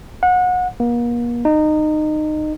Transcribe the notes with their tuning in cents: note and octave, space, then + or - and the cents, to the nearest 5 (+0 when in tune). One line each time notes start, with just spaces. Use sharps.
F#5 -30
A#3 +40
D#4 -20